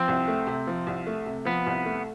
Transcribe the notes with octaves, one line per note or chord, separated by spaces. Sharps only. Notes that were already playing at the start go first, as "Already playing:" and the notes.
Already playing: F3 C4
C2
A3
C3
F3
C2
A3
C3
F3 B3
C2
A3